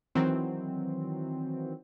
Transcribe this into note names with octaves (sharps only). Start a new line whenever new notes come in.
D#3 E3 F#3 C4